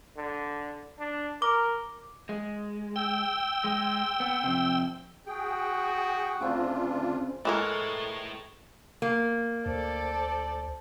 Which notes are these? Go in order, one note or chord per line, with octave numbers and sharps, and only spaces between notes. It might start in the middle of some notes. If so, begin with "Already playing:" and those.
D3
D4
A#4 D6
G#3
G5 E6
G#3
B3
F2 C3
F#4 G#4 G5
D2 C#3 C4 D4 F4
E3 G#3 A3 A4 A#4 C#5
A#3
D2 A4 C5 D5